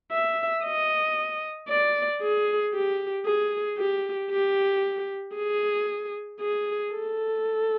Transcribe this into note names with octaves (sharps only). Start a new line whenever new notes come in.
E5
D#5
D5
G#4
G4
G#4
G4
G4
G#4
G#4
A4